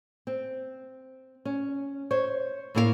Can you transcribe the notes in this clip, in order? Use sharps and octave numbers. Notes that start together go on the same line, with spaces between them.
C4
C#4
C5 C#5
A2 A3 A#3 E4 B4 F5